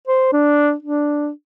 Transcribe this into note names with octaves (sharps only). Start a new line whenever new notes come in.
C5
D4
D4